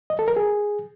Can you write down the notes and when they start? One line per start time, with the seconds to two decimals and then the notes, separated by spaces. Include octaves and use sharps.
0.10 D#5
0.19 A4
0.28 A#4
0.36 G#4